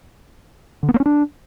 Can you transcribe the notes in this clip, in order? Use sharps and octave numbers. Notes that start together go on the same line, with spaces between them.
D3
B3
A#3
C#4
D4